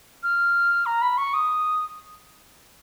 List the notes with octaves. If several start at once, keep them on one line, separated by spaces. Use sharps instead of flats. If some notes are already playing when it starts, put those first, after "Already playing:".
F6
A#5
B5
C#6
D#6